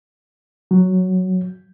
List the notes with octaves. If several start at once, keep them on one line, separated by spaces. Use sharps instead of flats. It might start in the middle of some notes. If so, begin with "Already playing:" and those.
F#3